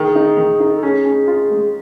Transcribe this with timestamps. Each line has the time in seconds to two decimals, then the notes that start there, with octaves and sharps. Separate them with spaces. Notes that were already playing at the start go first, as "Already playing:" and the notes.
Already playing: D#3 G#4
0.15 D#4
0.37 D#3
0.60 D#4
0.75 A4
0.83 C#4 G#4
1.05 C#4
1.27 F4
1.50 G#3